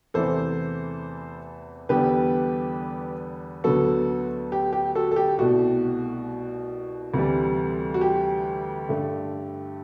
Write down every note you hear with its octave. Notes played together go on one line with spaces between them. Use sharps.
E2 C3 E3 A3 A4 C5
E2 D3 G3 B3 G4 B4
D2 D3 F#3 B3 F#4 A4
G4
G4
F#4 A4
A4
G4
C2 B2 A3 F#4
D2 C3 E3 G3
F#4
G4
G2 D3 A3